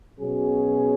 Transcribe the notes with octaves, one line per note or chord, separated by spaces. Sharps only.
B2 F#3 C#4 G#4